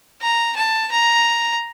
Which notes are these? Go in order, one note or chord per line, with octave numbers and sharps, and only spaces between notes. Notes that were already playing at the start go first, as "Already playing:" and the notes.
A#5
A5
A#5